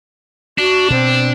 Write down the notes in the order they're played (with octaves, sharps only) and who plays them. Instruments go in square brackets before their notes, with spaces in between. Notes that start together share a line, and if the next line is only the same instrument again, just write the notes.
[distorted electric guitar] D4 [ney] F#4
[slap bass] B2 [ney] C4